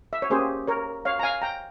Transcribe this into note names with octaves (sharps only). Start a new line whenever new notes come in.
E5
C#5
A#3 C#4 G4 G#4 C5
A#4 C#5
C#5 F5
A#5
F5 G#5
G5 A#5